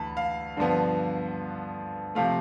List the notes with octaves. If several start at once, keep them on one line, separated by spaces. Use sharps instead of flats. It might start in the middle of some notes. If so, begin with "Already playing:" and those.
Already playing: D2 E3 A5 B5
F5
G2 D3 F3 B3
C3 F3 A3 F5